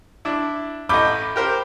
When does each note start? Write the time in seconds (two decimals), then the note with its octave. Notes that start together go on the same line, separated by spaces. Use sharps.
0.25 D4 E4
0.89 A1 A3 D#5 B5 D6 G6
1.36 G4 A#4 C5